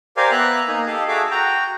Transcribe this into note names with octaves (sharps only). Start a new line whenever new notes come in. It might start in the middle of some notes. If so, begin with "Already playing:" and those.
G4 A#4 C5 D5 F5 G#5
B3 E5 A#5 F#6
A#3 D#4 G#5
G4 A4 D#5 F5
F#4 G#4 A4 E5 F5 D6
F#4 G5 A#5